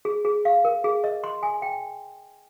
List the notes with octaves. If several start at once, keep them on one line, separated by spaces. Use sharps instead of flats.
G#4
G#4
F5
A#4
G#4
D#5
C6
G#5
G5